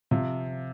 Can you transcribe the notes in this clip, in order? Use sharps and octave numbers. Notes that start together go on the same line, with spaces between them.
C3 F3 F4